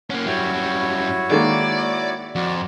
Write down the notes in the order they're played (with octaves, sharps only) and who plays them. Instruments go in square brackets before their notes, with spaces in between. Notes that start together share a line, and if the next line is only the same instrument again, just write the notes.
[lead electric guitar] A#3 C#4 [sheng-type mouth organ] F#5
[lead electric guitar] F#2 G3 [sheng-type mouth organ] E4 F#4 C#5
[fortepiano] D#3 G#3 A#3 [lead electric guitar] D5
[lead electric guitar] F2 [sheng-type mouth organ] F#4 D5